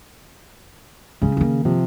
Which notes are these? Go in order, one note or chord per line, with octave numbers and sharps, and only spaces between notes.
C#3 G#3 C#4
D#3 A#3
C3 F3